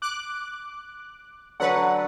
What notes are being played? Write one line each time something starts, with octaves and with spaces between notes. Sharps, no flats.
D6 F#6
D3 F#3 B4 F#5